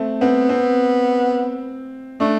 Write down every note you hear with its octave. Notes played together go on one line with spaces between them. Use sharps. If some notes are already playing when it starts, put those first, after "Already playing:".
Already playing: A3 C4
B3 C4
C4
A3 D4